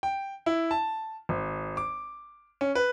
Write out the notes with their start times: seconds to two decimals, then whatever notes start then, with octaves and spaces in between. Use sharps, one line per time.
0.03 G5
0.46 E4
0.71 A5
1.29 G#1
1.77 D6
2.61 C#4
2.75 B4